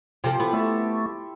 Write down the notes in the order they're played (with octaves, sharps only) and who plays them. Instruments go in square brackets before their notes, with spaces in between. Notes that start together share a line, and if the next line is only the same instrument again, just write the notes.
[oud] C3 F3 A4 [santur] F4 G4 C5
[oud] B3 [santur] E4 A4
[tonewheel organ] A3 [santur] A4 E5 C6